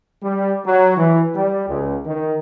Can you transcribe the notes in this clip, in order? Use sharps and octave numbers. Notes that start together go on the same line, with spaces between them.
G3
F#3
E3
G3
C#2
D#3